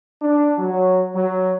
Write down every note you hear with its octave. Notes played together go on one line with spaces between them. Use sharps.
D4
F#3
F#3